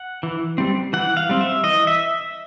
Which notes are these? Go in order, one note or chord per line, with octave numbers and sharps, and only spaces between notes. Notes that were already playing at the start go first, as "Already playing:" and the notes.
Already playing: F#5
E3
G3 C4
E3 F#5
F5
G3 C4
E5
E3 D#5
E5